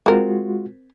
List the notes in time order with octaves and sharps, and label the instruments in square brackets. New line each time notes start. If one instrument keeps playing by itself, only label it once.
[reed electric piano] G#3 F4 F#4 [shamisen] C4 A#4